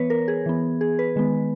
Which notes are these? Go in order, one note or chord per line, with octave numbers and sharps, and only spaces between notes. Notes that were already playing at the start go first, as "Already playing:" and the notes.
Already playing: E3 B3 B4 C#5
A#4
G#4
E3 B3
G#4
B4
D#3 G#3 B3